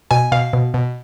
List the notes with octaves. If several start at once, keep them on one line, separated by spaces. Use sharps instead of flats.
B2 G#5
B2 F5
B2
B2